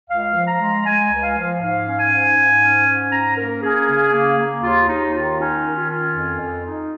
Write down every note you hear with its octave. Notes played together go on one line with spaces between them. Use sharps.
C#2 F5
F3
A#5
G#3
G#3 G#5
C#2
F5
F3
G#2 F5
C#4
G#5
G#2
G#2
C#4
G#2
C#4 A#5
A#3 A#4
C#4 G#4
C#3
A#3
A#3
D#2 F4
D#2 D#4
D#3 F4
C#4 D#4
D#3
F4
C#4
F2
F2
D#4